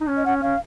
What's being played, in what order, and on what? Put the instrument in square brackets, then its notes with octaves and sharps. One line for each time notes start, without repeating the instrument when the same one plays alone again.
[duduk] D#4
C#4
[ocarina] D#5
[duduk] C#4 [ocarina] F#5
[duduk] C#4 [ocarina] F5